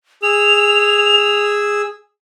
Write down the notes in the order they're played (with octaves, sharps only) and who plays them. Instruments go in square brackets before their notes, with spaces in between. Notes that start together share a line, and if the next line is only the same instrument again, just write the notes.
[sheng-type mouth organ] G#4 E6 [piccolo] F7